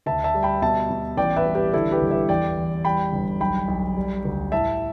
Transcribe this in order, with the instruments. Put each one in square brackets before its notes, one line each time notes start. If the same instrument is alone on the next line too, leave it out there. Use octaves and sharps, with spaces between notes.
[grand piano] D2 E5 A5
E5 A5
G3
G5 B5
B2 E5 A5
B2
A1 D5 G5
B4 E5
G3
G4 B4
D3 E4 A4
G4 B4
G1
B4 E5
E2 D5 G5
E2
G3 G5 B5
G1
B1 G5 B5
B1
G3
D2
A2 E5 A5